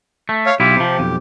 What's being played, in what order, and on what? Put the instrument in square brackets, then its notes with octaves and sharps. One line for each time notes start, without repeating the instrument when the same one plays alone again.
[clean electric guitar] A3
[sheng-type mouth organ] C#5 F5
[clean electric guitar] B1 E4 F4 [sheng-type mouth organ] G4
[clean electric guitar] C3 F3
B1 F2